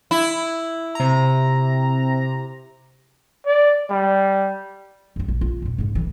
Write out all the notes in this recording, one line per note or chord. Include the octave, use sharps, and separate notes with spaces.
E4
C3 A#5
D5
G3
F2 G3
A#1
F4
F2 A#2
G#2 C#3
D3 E3